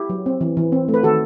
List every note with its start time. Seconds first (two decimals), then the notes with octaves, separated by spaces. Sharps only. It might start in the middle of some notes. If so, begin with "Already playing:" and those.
Already playing: E4 G4
0.10 F#3
0.26 C4
0.41 E3
0.57 E3
0.72 C4
0.88 A3
0.94 B4
1.03 D#3 F#4 A4